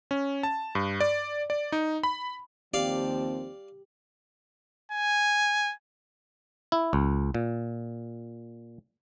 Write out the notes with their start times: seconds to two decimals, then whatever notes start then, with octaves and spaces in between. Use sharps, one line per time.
0.11 C#4
0.43 A5
0.75 G2
1.00 D5
1.50 D5
1.72 D#4
2.03 B5
2.74 D#2 F3 C4 G4 D5 F5
4.92 G#5
6.72 E4
6.93 C#2
7.35 A#2